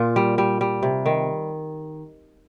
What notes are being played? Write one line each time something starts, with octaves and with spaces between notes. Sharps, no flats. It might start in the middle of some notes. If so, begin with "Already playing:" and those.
Already playing: A#2 F4
G3
G3
G3
C3
D#3